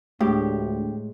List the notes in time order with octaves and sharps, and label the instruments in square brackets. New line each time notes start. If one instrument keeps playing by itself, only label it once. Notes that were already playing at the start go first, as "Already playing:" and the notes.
[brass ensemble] D2 [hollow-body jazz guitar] A2 [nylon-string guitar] G#3 [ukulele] G4